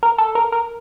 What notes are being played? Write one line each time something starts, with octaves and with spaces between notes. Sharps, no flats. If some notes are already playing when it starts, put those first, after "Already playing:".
A#4
A4
A#4
A#4